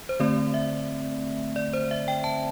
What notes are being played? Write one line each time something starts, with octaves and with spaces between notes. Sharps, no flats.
C5
D3 A3 C4 D5
E5
D5
C5
E5
G5
A5